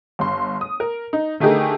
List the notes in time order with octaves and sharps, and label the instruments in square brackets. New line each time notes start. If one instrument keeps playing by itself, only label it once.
[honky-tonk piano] G1 C6
D#6
A#4
D#4
D3 A3 D#4 G4 G#4 A#4